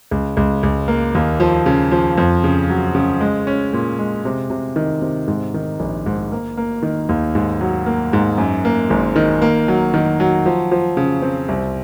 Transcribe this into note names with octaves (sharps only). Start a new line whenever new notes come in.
C#2
C#2
C#2
A#3
D#2
F3
C#3
F3
F2
C#3
F#3
C#3
G#3
C#4
A#2
G#3
C3
C3
D#3
C3
G#2
D#3
A#1
G#2
A#3
A#3
D#3
D#2
G#2
F#3
A#3
G#2
F#2
A#3
G#1
D#3
A#3
F#3
D#3
F#3
F3
F3
C#3
C4
C2